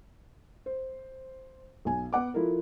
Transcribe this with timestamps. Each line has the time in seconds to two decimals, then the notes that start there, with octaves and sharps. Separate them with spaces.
0.66 C5
1.85 B1 G#5
2.13 B3 F#5 D6
2.34 F3 E4 F4 A4 A#4